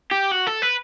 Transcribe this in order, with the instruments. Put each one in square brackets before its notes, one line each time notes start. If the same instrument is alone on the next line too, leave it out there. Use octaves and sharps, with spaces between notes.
[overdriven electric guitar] G4
F#4
A4
B4